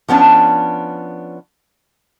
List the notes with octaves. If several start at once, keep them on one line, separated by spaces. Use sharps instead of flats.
F3 B3 C#4 D4